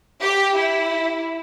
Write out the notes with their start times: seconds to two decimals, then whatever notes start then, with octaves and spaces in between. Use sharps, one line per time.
0.22 G4
0.56 E4